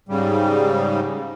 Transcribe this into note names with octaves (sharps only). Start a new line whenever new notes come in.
G#2 C#3 G3